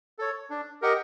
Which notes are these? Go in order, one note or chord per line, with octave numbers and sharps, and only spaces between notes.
A4 C#5
D4
G4 A#4 D#5 F#5